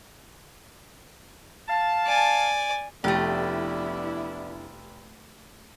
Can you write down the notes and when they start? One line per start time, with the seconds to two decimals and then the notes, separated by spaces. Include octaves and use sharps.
1.68 F5 A5
2.06 D5 G#5
3.04 F1 A3 B3 D4 E4 G4